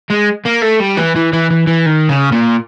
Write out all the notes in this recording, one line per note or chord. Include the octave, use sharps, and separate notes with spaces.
G#3
A#3
A3
G3
E3
E3
E3
E3
E3
D#3
C#3
A#2